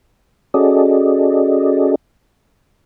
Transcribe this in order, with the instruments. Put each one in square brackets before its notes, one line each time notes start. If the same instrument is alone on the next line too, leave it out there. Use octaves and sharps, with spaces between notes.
[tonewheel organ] C#4 F#4 G#4 A4 D5 D#5